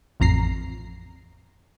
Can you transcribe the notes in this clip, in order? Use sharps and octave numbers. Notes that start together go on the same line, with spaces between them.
A1 F2 A#5 C7